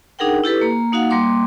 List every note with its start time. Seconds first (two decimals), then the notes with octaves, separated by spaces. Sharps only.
0.19 D4 D#4 G#4 A#4 F#5 G5
0.44 E4 G4 A4 B4
0.61 A#3 A#5
0.92 A#3 D#4 F#4 F5 F#5
1.10 G3 A#3 C6 D6